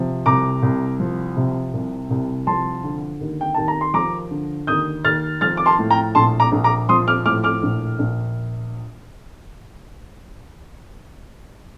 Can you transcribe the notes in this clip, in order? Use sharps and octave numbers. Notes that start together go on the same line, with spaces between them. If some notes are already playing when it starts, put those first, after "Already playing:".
Already playing: C3 F3
C2 A#5 D6
C2
F3
C3
C2
C2
F3 A5 C6
D3
D#2
G5
D#2 A5
A#5
C6
F3 A#5 D6
D3
D#2 D#6 G6
D#2 F6 A6
F3 F6 A6
D6
A5 C6
A2
G5 A#5
A#1 A5 C6
A#5 D6
A#1
A#5 D6
F3 C6 D#6
D6 F6
A2 D6 F6
D6 F6
A#1
A#1